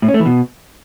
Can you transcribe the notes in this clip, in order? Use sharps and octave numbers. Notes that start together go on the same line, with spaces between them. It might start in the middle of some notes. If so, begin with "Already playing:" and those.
A2
C#4
A3
E3
B2